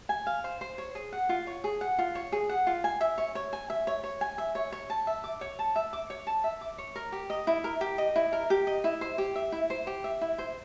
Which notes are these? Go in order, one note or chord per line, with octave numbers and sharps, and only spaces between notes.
G#5
F5
C5
C5
C#5
G#4
F#5
F4
C#5
G#4
F#5
F4
C#5
G#4
F#5
F4
G#5
E5
C#5
C#5
G#5
E5
C#5
C#5
G#5
E5
C#5
C#5
A5
E5
D6
C#5
A5
E5
D6
C#5
A5
E5
D6
C#5
A#4
G4
D#5
E4
A#4
G4
D#5
E4
A#4
G4
D#5
E4
C5
G4
E5
E4
C5
G4
E5
E4
C5